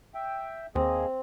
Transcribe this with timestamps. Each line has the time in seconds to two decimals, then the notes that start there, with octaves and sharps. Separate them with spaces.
0.15 E5 G5
0.75 D#2 A#3 C4 G#4 D#5